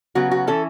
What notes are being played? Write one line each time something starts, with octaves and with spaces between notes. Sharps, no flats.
C#3 F#3 B3 F#4
F#4
E3 C#4 E4 A4